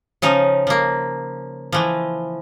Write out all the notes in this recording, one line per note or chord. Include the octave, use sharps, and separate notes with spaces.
C#3 F3 D#4
F3 A#3
E3 F3